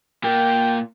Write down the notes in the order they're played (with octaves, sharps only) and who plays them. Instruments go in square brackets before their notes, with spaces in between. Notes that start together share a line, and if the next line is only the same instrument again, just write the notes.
[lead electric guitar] A#2 A#3 [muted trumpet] G5